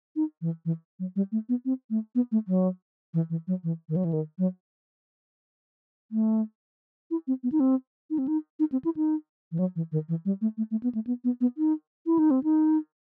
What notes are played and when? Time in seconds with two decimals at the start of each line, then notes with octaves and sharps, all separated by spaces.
0.16 D#4
0.42 E3
0.65 E3
0.99 F#3
1.16 G3
1.32 A3
1.49 B3
1.65 C4
1.90 A3
2.15 B3
2.32 A3
2.48 F#3
3.14 E3
3.30 E3
3.47 F#3
3.64 E3
3.89 D#3
3.96 F#3
4.05 E3
4.13 D#3
4.38 F#3
6.12 A3
7.11 E4
7.27 C4
7.43 B3
7.52 D#4
7.60 C4
8.10 D#4
8.18 C4
8.28 D#4
8.60 D#4
8.72 C4
8.85 E4
8.96 D#4
9.52 E3
9.59 F#3
9.76 E3
9.92 D#3
10.09 E3
10.25 G3
10.41 A3
10.57 A3
10.71 A3
10.83 B3
10.95 A3
11.07 B3
11.24 B3
11.41 B3
11.58 D#4
12.06 E4
12.19 D#4
12.31 C4
12.44 D#4